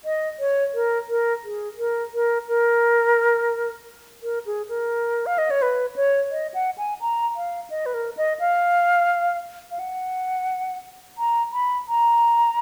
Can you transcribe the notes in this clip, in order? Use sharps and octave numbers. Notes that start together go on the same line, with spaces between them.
D#5
C#5
A#4
A#4
G#4
A#4
A#4
A#4
A#4
G#4
A#4
F5
D#5
C#5
B4
C#5
D#5
F#5
G#5
A#5
F5
D#5
B4
A#4
D#5
F5
F5
F#5
A#5
B5
A#5